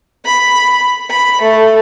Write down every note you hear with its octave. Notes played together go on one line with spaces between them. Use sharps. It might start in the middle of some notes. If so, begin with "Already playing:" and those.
B5
B5
A3